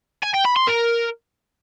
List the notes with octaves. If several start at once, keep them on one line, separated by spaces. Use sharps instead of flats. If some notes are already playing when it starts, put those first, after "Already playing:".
G#5
G5
B5
C6
A#4